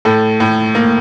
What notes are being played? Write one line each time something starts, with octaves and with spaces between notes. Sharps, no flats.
A2 A4
A2
A#3